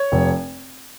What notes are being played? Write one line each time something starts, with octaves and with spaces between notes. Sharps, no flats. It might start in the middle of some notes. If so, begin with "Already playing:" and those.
Already playing: C#5
F1